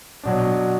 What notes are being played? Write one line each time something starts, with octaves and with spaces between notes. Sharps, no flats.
B2 F#3 D4